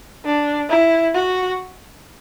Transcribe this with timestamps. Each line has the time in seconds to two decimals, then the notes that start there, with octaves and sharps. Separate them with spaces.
0.25 D4
0.69 E4
1.14 F#4